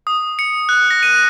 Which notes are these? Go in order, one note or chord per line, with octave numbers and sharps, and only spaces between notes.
D#6
C#7
F#6
A#6
D#7